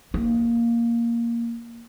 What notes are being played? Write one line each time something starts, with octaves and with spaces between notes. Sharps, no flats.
A#3